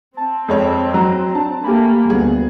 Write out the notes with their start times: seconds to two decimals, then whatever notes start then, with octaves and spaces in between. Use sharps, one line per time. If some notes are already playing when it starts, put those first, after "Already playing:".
0.17 C4 A5
0.48 F2 G#3 C#5
0.94 F#3 A#5
1.35 D4 A5
1.64 A3 A#3 G4 G#5 B5
2.10 D2 G3 B3 G#4